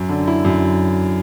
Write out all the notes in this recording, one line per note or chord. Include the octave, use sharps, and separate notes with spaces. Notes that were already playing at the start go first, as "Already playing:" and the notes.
Already playing: F#2
D3
E4
F#2